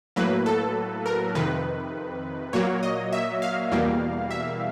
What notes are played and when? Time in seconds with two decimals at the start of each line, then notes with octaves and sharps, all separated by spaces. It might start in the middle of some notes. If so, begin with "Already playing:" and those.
0.16 A2 F#3 A#3 B4
0.46 A4
1.06 A#4
1.35 F2 C3 D#3 B4
2.53 A#2 F#3 A#3 C#5
2.83 D#5
3.13 E5
3.42 F5
3.72 E2 B2 G3 A#3
4.31 E5